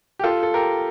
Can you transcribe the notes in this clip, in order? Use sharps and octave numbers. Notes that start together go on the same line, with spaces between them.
G4
F4 A4
A4
G4 A#4